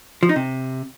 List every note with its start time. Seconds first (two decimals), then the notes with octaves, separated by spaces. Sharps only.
0.23 F3
0.29 D#4
0.36 C3